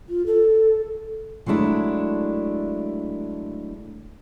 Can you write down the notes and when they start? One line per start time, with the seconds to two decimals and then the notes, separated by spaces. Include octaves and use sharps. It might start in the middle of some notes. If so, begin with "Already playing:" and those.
0.09 F4
0.26 A4
1.46 F#3 G#3 A3 D4 E4